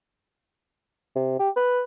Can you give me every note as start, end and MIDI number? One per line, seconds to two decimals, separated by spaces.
1.16 1.36 48
1.39 1.50 67
1.56 1.82 71